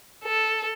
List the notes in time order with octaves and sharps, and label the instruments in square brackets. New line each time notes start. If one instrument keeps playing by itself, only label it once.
[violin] A4